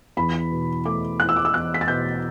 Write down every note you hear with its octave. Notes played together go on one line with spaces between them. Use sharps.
E2 B5
B2
A3 D6
E4 F#6
E6
D6
E6
E2 F#6
B6
A6
B2 G6